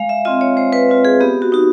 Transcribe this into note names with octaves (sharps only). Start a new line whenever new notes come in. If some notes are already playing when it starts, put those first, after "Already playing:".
Already playing: G#3 F5
E5
C4 F4 D#5
C#5
G#3 C5
B4
C4 F4
G#4
B3 G4
F#4
D#4 F#4